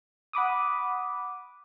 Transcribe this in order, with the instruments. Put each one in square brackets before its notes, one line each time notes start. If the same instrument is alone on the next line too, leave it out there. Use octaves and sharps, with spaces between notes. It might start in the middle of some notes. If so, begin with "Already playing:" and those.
[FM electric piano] F#5 B5 D6 D#6